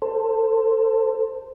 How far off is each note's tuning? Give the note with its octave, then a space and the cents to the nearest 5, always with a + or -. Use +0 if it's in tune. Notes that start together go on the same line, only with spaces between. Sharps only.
A4 +25 C5 +0